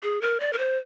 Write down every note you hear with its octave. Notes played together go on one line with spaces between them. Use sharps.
G#4
A#4
D5
A#4
C5